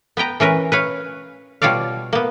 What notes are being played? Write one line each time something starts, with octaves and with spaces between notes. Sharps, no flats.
B3 B4 G5 A#5
E3 C#4 A#4 B4
B4 C#5 F5
B2 G3 F4 C#5 D5 F5
A#3 B3